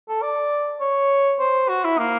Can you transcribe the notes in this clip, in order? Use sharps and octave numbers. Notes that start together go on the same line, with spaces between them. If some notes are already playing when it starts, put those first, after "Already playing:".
A4
D5
C#5
C5
F#4
E4
A#3